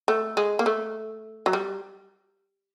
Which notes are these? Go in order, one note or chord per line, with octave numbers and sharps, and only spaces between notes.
A3
G#3
A#3
A3
F#3
G3